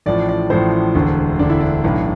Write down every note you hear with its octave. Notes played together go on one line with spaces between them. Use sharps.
A1 A2 F3 D5
D5
A1 A2 F3 C5
E1 D2 D3
E1 D2 D3 D4
E4
D4
B1 A2 E3